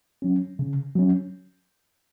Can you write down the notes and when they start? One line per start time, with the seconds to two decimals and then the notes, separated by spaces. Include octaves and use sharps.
0.22 F#3 C#4
0.59 C#3
0.95 F#3 C#4